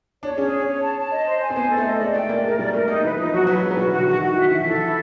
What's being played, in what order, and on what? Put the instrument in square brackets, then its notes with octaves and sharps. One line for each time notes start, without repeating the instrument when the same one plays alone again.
[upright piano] D4 [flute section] C#5
[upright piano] C#4 [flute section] G#4
[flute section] C#5
C#5
A5
A5
D#5
C5
G#5
[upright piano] C4
[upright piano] B3 [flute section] C5
[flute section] A4
[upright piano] A3
[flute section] D#5
[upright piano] G#3 [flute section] D5
[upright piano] A3 [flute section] G5
[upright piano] A#3 [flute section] D5
[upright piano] G#3 [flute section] A#4
[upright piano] G3 [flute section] D5
[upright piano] A3 [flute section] A#4
[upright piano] A#3 [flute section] D#4
[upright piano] E3 [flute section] B4
[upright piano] F3 [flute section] D#4
[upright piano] F#3 [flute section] F#4
[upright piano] F#3 [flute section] B4
[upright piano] G#3 [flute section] B4
[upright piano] F#3
[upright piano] G3 [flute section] F#4
[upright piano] E3
[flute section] F#4
[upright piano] D3
[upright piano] D#3 [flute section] F#4
[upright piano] D#3 [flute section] F#4
[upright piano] E3 [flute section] E5
[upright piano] E3 [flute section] E5
[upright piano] F3
[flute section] A4
[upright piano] E3
[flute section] E4